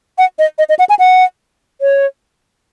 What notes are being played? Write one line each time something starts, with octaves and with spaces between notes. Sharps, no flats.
F#5
D#5
D#5
D#5
F#5
G#5
F#5
C#5